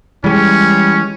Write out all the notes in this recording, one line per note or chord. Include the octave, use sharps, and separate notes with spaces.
E3 G3 G#3 C#4